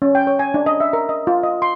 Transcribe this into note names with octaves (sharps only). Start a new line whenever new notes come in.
C#4
G5
C#5
G#5
D4
D#5
E5
A#4
D#5
F4
D#5
C6